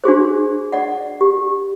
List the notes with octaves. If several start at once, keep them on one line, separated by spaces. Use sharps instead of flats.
D4 F#4 G#4 C5
D5 F#5
G4